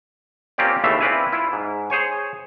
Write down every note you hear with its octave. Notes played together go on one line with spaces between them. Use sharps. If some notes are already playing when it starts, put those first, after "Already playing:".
A#3 C4 C#4 F4 G4 D5
D#2 C#3 E3 A3 E5 F5
C4 E4 B4 D5 F5 G#5
E4 F4
G#2
G#4 C5 C#5 G#5